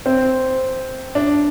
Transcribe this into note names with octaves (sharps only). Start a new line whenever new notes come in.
C4
D4